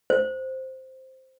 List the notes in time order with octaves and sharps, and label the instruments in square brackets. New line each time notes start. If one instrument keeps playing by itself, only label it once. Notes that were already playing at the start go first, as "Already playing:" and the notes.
[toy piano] C5